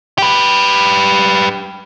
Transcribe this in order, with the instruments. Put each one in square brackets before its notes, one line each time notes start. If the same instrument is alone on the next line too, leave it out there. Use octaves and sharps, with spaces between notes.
[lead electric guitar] G4 B4